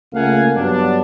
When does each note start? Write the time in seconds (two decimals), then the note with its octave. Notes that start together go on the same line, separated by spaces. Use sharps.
0.13 C#2 A3 A#3 F5 F#5 G#5
0.55 G2 F#3 B3 D4